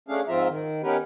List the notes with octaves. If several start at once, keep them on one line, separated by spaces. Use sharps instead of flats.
A3 C#4 D4 G#4 F5
G#2 F3 C4 F4 E5 A#5
D#3
B3 C#4 D#4 G4 A#4 B4